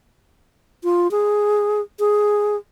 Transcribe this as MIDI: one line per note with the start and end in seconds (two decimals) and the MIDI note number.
0.84 1.10 65
1.11 1.81 68
1.99 2.56 68